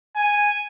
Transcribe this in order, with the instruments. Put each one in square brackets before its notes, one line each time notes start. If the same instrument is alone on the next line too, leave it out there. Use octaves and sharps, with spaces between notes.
[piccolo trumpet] G#5